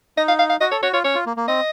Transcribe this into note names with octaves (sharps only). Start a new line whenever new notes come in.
D#4 D#5
F5
F5
F5
F#4 D#5
A4 C#5
F#4 C#5
F4 C#5
C#4 C#5
F4
A#3
A#3
C4 D#5